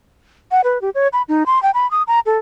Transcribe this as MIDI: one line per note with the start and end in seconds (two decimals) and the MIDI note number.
0.51 0.61 78
0.64 0.81 71
0.82 0.90 67
0.95 1.08 73
1.13 1.22 83
1.29 1.43 63
1.46 1.61 84
1.63 1.71 79
1.74 1.89 83
1.91 2.03 87
2.08 2.20 82
2.26 2.38 69